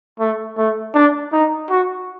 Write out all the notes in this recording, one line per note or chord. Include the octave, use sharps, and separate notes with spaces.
A3
A3
D4
D#4
F#4